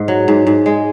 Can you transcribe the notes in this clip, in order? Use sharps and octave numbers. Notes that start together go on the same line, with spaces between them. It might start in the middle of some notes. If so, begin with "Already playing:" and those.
Already playing: G#2
F#3
G#2
G#2
G#3